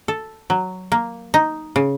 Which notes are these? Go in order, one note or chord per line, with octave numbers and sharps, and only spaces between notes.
A4
F#3
A#3
D#4
C#3